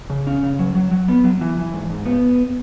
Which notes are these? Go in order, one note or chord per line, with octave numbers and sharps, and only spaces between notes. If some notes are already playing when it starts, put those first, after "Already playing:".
C#3
C#4
C#3
F#3
F#3
F#3
B3
F#3
E3
E3
G#2
G#2
B3